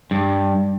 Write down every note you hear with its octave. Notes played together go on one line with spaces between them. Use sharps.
G2